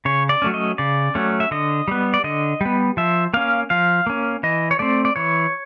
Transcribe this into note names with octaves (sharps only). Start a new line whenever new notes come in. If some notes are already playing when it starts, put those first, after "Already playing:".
C#3 C#5
D5
F#3 A3 C#4
D#5
C#3 D5
F#3 A3 C#4
E5
D3 D#5
G3 B3
D5
D3 D#5
G3 B3
F3 E5
A#3 C#4 F5
F3 F5
A#3 C#4
E3 D#5
C#5
A3 C4 D5
D5
E3 C#5